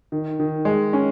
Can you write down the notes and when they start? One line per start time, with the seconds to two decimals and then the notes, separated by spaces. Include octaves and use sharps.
0.12 D#3
0.40 D#3
0.65 G#3
0.93 C#4